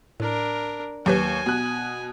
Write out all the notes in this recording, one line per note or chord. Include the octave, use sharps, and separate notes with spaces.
A2 D4 A#4
D#2 F#3 G4 B4 G#5
B2 F#6